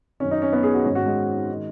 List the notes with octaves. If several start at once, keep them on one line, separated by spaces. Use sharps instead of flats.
F#2 D#3 C#4
D#4
C#4
B3
G#4
F#4
G#2 D#3 C#4
F#4
G#3
D#3